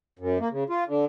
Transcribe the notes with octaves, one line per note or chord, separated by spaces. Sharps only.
F#2
A#3
C#3
F4
D3